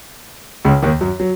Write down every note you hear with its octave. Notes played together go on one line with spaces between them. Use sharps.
C#2 C#3
D#2 D#3
F#2 F#3
F#3